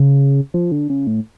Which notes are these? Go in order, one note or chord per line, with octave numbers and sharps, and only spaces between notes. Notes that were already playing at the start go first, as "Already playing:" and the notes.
Already playing: C#3
F3
D3
C#3
A2